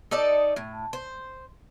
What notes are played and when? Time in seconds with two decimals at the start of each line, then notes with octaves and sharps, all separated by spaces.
0.11 D#4 A4 D5 D#5
0.56 A2
0.93 C5